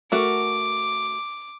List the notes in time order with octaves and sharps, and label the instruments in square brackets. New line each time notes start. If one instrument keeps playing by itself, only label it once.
[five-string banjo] A3 F#4 A#4 [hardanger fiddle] D6